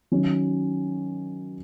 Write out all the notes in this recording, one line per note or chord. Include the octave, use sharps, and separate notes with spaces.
D#3 F#3 C#4